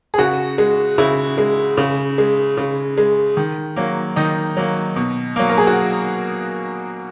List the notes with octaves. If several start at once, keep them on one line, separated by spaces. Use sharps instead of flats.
G#4
C#3 F#4
G#3
C#3 E4
G#3
C#3
G#3
C#3
G#3
D#3
F#3 A#3
D#3 D#4
F#3 A#3
B2
F#3 A#3
A#4
G#4
F#4